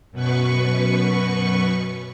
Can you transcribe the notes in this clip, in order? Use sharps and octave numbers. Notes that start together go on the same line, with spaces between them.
F#2 B2 B4 C#6